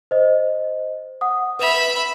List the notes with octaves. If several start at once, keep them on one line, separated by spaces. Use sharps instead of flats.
C5 D#5
F#5 D#6
B4 E5 B5 F7